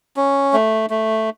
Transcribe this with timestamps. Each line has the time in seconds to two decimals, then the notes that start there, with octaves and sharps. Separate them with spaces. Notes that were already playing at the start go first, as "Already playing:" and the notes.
0.16 C#4
0.53 A3
0.90 A3